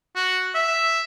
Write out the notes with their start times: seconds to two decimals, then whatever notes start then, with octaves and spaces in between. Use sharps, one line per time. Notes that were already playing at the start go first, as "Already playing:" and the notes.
0.16 F#4
0.55 E5